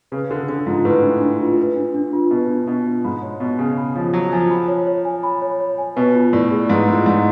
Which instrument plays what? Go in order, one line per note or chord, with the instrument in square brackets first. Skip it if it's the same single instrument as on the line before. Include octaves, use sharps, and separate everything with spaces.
[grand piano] C#3 [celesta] B4
[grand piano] D3 [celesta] D4
[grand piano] D3 [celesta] D4
[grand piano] G#2 [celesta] F4
[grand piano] A2 [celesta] B4
[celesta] D4
D4
F4
B4
D4
D4
F4
[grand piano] B2 [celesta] B4
[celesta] D4
[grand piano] B2 [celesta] D4
[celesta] F4
[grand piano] G#2 [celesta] B5
[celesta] C#5
[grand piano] B2 [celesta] C#5
[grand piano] C#3 [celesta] G#5
[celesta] B5
[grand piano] F3 [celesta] C#5
[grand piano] F#3 [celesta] C#5
[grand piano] F3 [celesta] G#5
[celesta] B5
C#5
C#5
G#5
B5
C#5
C#5
G#5
[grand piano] B2 [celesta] B4
[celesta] F4
[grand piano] A2 [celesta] D5
[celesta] G#4
[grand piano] G#2 [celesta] B4
[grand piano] A2 [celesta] F4
[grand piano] G#2 [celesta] D5